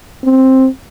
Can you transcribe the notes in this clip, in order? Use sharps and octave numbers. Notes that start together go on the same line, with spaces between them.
C4